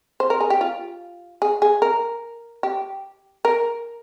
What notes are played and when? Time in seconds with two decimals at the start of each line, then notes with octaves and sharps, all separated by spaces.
0.20 C5
0.30 A#4
0.40 G#4
0.50 G4
0.61 F4
1.42 G#4
1.62 G#4
1.82 A#4
2.63 G4
3.45 A#4